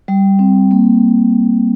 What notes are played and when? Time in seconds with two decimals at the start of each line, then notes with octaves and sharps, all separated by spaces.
0.08 G3
0.39 C4
0.71 A#3